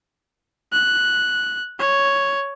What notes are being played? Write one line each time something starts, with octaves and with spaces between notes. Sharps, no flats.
F#6
C#5